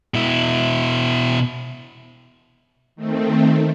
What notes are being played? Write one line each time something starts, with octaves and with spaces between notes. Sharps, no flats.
B2 E4
D#3 A3 C4